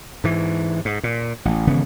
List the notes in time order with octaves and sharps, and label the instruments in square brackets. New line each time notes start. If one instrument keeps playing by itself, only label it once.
[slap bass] G#2 E3
G#2
A#2
A1
G#1 C#3 E3 B3